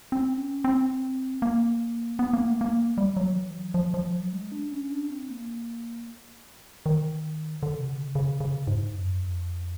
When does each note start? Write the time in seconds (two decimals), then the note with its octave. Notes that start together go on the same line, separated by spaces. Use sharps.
0.12 C4
0.37 C#4
0.64 C4
1.42 A#3
2.19 B3
2.33 A#3
2.47 A3
2.61 A#3
2.98 G3
3.17 F#3
3.36 E3
3.55 F#3
3.74 F3
3.94 F3
4.13 F#3
4.33 G#3
4.52 D4
4.72 C#4
4.92 D4
5.10 C4
5.30 A#3
6.86 D#3
7.63 D3
7.81 C3
7.89 C#3
8.15 C#3
8.40 C#3
8.67 G#2
8.93 F#2
9.19 F2